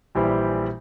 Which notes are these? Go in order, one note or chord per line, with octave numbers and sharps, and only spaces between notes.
A#1 E3 G3 E4 G4 C5